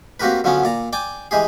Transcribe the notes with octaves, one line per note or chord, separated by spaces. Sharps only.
A#3 C4 F#4 G4 A#4 B4
D3 F3 F#3 B3 C#4
A#2 D5 A#5
D5 G5 G#5 D6
E3 G#3 G4 G#4